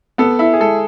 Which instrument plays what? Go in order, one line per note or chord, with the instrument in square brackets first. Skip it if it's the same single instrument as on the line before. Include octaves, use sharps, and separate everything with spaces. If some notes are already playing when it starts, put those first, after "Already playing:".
[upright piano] B3 [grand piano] A4
[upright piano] E4
[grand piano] G#4
[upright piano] G#3 [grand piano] A4